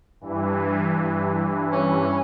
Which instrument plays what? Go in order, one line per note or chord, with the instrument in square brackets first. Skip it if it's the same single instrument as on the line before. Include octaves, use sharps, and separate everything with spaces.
[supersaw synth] G2 E3
[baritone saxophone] C#4